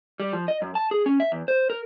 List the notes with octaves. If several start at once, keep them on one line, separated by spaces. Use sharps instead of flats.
G3
F3
D#5
F#2
A5
G#4
C#4
E5
E2
C5
A#4